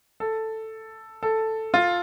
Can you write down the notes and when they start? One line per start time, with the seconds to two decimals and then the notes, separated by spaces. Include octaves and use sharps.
0.20 A4
1.23 A4
1.74 F4